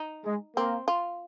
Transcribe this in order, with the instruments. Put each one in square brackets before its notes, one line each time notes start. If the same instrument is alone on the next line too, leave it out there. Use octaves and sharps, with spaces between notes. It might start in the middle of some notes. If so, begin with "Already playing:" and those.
Already playing: [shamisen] D#4
[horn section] G#3
[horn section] A#3 [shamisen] C4
[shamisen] F4